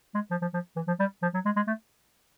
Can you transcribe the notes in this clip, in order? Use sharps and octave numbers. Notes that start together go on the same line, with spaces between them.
G#3
F3
F3
F3
E3
F3
G3
F3
F#3
G#3
G#3
A3